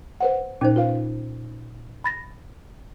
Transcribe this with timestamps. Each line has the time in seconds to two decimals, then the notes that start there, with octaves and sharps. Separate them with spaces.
0.20 B4 C5 F#5
0.61 A#2 C#4 D#4 C5
0.76 F4 B4 F5
2.04 B5 A6 A#6